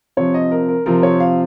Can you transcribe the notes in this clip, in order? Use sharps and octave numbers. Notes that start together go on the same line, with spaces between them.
C3 F3 C4 C#5
D#5
A#4
A#4
C3 F3 C4 A#4
C#5
F5